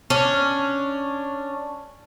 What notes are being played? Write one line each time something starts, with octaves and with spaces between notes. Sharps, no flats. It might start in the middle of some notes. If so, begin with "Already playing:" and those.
C#4 D4